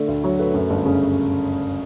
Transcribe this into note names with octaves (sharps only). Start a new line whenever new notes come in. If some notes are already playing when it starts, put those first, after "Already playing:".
Already playing: D3 A3 D5
D2
F#3 C#5
A3 B4
F#2
G1
C#3 C#4